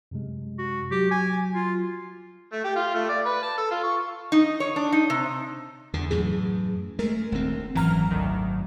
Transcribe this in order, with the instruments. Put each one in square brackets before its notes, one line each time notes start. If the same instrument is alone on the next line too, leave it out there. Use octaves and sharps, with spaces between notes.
[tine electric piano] F#2 C3 G#3
[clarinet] F#4
[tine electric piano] F#3 F#4 [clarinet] G4
[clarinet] G#5
F4
[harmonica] A3
G4
F4
A3
D5
B4
A5
A4
F4
C#6
[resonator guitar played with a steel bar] D#4
C#5
D4
D#4
C3
[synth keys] E2 [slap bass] D3
[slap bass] F#2 A2 E3 [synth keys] G#4
[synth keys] G#3 A#4 [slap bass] A3
[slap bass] D#1 D2 C4
[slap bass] G#1 F#2 [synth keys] E3 A#5 F6
[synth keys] D2 D#3